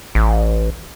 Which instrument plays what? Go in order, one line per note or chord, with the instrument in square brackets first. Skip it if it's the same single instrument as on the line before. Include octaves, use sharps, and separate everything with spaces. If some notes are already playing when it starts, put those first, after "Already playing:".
[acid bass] A1